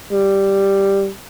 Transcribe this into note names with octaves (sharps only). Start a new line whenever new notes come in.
G3